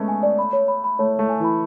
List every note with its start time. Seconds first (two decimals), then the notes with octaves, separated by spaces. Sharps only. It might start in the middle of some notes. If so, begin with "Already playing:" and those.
Already playing: G#3 A3 B3 C#4
0.08 G#5
0.23 D5
0.39 B5
0.53 C#5
0.68 B5
0.84 B5
0.99 A3 C#5
1.15 A3 C#5
1.29 G#5
1.40 E3 B5